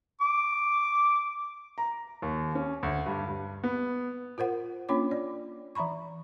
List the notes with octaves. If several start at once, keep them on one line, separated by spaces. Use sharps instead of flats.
D6
A#5
D#2
C#4
D2
G2
G2
B3
F4 A#4 C5 F#5
A#3 C#4 D4 F4 C#5 D6
D5
E3 E5 A#5 B5 C#6